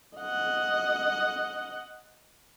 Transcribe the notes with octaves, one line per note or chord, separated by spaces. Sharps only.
D#5 F#5